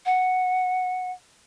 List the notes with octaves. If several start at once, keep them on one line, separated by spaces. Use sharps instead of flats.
F#5